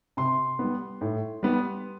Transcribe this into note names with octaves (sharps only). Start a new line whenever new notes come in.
C3 C6
G3 B3
A2
G3 B3